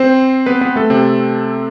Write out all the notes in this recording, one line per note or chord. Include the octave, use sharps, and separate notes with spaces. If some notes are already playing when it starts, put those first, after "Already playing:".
Already playing: C4 C5
B3 B4
B3 B4
A3 A4
C3 C4